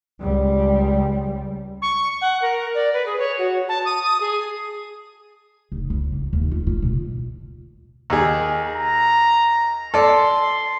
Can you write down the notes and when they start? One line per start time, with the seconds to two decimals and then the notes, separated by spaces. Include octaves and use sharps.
0.21 C#2 G3
1.82 C#6
2.21 F#5
2.42 A#4
2.74 D5
2.93 B4
3.06 G#4
3.19 C#5
3.38 F#4
3.69 A5
3.85 D#6
4.04 D#6
4.21 G#4
5.72 F1
5.90 C#2
6.12 A#3
6.33 D#2
6.51 F4
6.67 F4
6.82 B2
8.10 D#2 G#4
8.66 A#5
9.94 A4 D5 C6